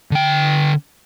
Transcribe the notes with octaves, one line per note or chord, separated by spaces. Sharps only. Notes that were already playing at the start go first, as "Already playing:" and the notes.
D3 G5